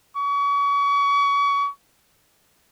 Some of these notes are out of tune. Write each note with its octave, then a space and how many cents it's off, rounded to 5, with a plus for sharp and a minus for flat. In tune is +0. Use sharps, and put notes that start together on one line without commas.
C#6 +35